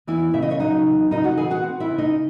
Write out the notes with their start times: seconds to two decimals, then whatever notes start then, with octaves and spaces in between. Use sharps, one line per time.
0.07 E2 E3 E4
0.34 C#3 E5
0.42 D#5
0.51 C#5
0.60 F#3 D#4 D#5
0.86 E2
1.11 C#3 D#4 D#5
1.24 F#4 F#5
1.37 E3 G#4 G#5
1.50 F#4 F#5
1.64 C4
1.80 E4 E5
1.90 C#3
1.98 D#4 D#5